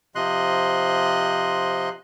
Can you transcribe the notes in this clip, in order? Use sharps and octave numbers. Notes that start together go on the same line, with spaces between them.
C3 F3 D#5 C6 F#6